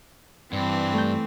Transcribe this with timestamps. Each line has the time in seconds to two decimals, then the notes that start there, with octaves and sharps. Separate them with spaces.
0.53 G2 E3 C4
0.94 A3 G6